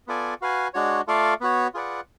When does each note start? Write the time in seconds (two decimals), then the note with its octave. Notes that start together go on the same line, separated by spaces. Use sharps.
0.07 B3 F4 A4 D5 G#5
0.41 F#4 B4 F5 G#5
0.74 G#3 D4 F#4 C#5
1.08 A3 F4 A4 D5 F5
1.41 B3 F#4 C#5
1.74 F4 G#4 B4 D5 F#5